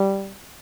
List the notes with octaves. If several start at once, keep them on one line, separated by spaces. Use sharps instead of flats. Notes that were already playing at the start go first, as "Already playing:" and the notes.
Already playing: G3